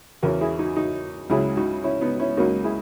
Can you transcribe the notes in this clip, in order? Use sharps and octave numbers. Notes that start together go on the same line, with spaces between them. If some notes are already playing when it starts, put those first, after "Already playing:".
E2 C#3 E3 F#4 A#4
E4 G#4
D#4 F#4
D#4 F#4
C#2 C#3 F#3 E4 G#4
D#4 F#4
C#4 E4
B3 D#4
C#4 E4
C#2 C#3 F#3 A#3 D#4 F#4
E4 G#4